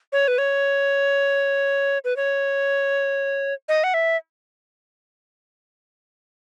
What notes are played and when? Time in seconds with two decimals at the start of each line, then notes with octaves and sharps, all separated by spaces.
0.12 C#5
0.28 B4
0.38 C#5
2.05 B4
2.17 C#5
3.69 D#5
3.84 F#5
3.94 E5